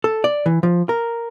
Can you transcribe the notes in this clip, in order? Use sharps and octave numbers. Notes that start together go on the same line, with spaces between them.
A4
D5
E3
F3
A#4